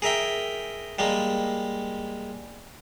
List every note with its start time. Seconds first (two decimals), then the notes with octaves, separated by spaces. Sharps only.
0.02 G#4 A#4 E5 G5
0.99 G3 G#3 A#3